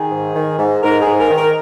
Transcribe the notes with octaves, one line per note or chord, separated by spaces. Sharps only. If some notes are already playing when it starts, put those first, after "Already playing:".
Already playing: D#3 G#4
G#2
D#3
G#2
G#2 A#4
G#2 G#4
A#4
D#3
A#4